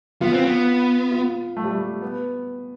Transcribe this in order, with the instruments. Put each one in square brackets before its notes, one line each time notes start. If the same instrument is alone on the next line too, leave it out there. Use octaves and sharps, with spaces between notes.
[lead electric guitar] B3 [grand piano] F4
[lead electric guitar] C4
B3
[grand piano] F4
A3
G3
A3
B3